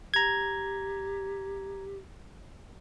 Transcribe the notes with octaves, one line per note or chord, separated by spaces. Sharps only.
G4 A#5 G#6